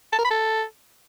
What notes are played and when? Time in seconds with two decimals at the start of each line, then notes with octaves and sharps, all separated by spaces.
0.12 A5
0.18 A#4
0.24 B5
0.30 A4